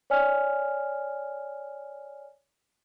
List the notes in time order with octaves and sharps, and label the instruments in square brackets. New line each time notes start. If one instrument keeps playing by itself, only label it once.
[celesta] C#5 D5 G#5 F6